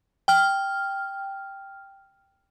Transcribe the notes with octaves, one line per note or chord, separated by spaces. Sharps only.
G5 F6